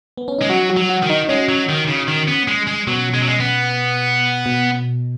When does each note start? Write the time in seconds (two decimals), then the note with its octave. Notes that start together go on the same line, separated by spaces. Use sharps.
0.17 B3
0.28 C#4
0.39 G#3 D#4
0.49 F#3 F#4
0.70 F#4
0.77 F#3
0.89 F#4
1.02 D#3
1.09 D#4
1.24 D#4
1.29 G#3 C#4
1.48 F#3
1.69 D#3
1.88 C#3
2.08 D#3
2.28 B3
2.48 G#3
2.67 G#3
2.87 B2 F#3
3.14 G#3
3.21 F#3
3.28 G#3
3.40 B3
4.46 B2